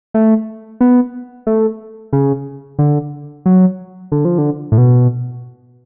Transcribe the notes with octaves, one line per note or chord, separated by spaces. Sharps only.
A3
B3
A3
C#3
D3
F#3
D3
F3
D3
A2
B2